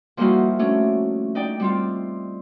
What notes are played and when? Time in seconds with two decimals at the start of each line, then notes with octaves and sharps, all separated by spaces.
0.17 F3 G3 A#3 D#4 E4 F#4
0.59 A3 C#4 D4
1.35 D#4 D5 G5
1.60 G3 C4 F4